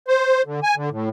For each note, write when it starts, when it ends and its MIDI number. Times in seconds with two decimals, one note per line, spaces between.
0.08 0.42 72
0.46 0.60 50
0.63 0.75 80
0.76 0.90 50
0.91 1.09 45